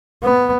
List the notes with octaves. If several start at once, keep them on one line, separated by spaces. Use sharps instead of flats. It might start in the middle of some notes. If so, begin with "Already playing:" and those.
B3